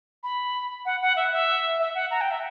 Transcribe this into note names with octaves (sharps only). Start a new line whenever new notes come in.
B5
F#5
F#5
E5
E5
E5
F#5
A#5
G5
E5